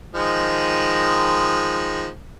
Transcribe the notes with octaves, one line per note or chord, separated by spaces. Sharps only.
D#3 F3 G#3